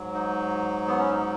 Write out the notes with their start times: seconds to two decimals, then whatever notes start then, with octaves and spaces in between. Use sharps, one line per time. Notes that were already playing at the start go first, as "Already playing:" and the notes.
Already playing: G#2 F#3
0.14 D#4
0.88 B3
0.99 C#4
1.12 D#4